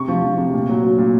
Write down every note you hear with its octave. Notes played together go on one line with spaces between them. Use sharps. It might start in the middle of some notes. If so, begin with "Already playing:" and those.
Already playing: C3 C#6
F3
F3
C3
A#2
F#3
F#3
A#2